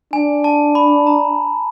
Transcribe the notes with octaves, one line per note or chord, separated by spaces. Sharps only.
D4 G#5
A5
B5
A#5